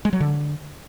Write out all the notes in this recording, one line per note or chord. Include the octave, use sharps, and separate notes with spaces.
G#3
F#3
D3